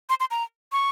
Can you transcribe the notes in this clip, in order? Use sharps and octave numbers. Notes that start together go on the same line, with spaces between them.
C6
C6
A#5
C#6